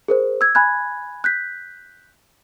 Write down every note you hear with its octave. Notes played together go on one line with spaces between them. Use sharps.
G#4 A#4 C5
E6 G#6
G#5 B5 F#6 G#6
F#6 G6 B6